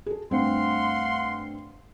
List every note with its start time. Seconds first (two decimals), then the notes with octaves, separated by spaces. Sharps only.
0.06 G#4 A4
0.31 G2 A3 C4 F5 F#5 C6